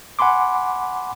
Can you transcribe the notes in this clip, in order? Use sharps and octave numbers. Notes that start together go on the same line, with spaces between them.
F#5 G#5 B5 C6 D6